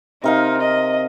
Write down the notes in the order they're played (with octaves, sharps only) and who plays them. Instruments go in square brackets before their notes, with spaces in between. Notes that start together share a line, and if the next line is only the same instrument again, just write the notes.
[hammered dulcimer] C3 A#4 F5 [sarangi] D#4
[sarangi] D#5